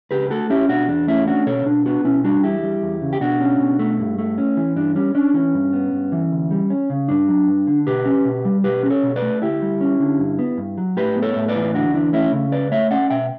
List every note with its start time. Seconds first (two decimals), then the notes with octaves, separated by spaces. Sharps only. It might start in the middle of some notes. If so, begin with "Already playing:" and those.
0.11 C#2 G4 B4
0.30 A3 F#4 A4
0.50 C#4 E4 G4
0.69 B2 D4 F#4
0.88 E2 D4
1.07 A3 C#4 E4
1.27 C#4 D4 F#4
1.46 B2 A4 C#5
1.66 B2 D4
1.86 B3 D4 F#4
2.05 B2 C#4 E4
2.24 G3 D4 F#4
2.43 E2 E4 G4
2.64 G3
2.82 E2
3.02 C#3
3.13 G4
3.21 B2 D4 F#4
3.41 C#4
3.60 B2
3.79 A3
3.99 G2
4.18 A3
4.38 C#4
4.57 E3
4.76 G2 D4
4.95 G3 C#4
5.15 C#4 D4
5.34 E3 C#4
5.54 G2
5.73 B3
5.93 G2
6.12 E3
6.31 D2
6.51 G3
6.70 C#4
6.90 C#3
7.09 G2 D4
7.28 F#3
7.48 G2
7.67 D3
7.87 B2 G4 B4
8.06 C#4
8.25 B2
8.45 G3
8.64 B2 G4 B4
8.83 C#4 B4
8.90 A4 C#5
9.03 B2
9.16 B4 D5
9.22 A3
9.41 D2 E4 G4
9.62 G3
9.81 C#4
10.00 D3
10.19 G2
10.39 B3
10.58 G2
10.78 F#3
10.97 A2 G4 B4
11.16 B3
11.22 A4 C#5
11.36 A2
11.48 B4 D5
11.56 E3
11.74 D2 D4 F#4
11.94 E3 D4
12.13 A3 C#4 E4
12.32 C#3
12.52 C#2 B4 D5
12.71 A3 C#5 E5
12.91 C#4 D5 F#5
13.10 B2 E5 G5